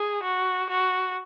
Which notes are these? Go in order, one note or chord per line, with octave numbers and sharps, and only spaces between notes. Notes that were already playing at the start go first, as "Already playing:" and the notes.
Already playing: G#4
F#4
F#4